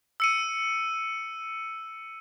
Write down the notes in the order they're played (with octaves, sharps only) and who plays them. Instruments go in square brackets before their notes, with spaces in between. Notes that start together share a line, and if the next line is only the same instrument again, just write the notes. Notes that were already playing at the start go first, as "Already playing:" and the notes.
[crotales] E6 C#7 D#7